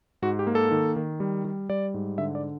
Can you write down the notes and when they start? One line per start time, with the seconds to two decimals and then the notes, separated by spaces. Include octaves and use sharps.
0.22 G#2 F#4
0.39 G4
0.47 A#3
0.55 A4
0.71 D#3
0.96 D#3
1.20 G3
1.45 G3
1.69 G3 D5
1.94 G#2
2.18 D3 E5
2.35 D5